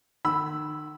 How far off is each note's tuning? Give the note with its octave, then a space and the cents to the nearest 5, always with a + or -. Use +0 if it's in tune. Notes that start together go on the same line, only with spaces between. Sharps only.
D#3 -40 B5 +0 E6 +0